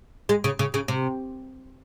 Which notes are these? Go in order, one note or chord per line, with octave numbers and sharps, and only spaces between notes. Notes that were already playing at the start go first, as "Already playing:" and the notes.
G#3
C#3
C#3
C#3
C3